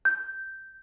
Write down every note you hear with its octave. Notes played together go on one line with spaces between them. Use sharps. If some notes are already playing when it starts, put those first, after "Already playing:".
G6